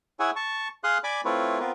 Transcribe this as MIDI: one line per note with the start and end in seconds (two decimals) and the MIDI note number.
0.20 0.31 64
0.20 0.31 68
0.20 0.31 73
0.20 0.31 76
0.20 0.31 78
0.20 0.31 80
0.36 0.68 81
0.36 0.68 85
0.84 0.98 68
0.84 0.98 77
0.84 0.98 84
0.84 0.98 87
0.84 0.98 90
1.04 1.21 74
1.04 1.21 80
1.04 1.21 83
1.04 1.21 86
1.25 1.60 57
1.25 1.60 60
1.25 1.60 64
1.25 1.60 65
1.25 1.60 71
1.25 1.60 73
1.60 1.72 59
1.60 1.72 60
1.60 1.72 65
1.60 1.72 70
1.60 1.72 71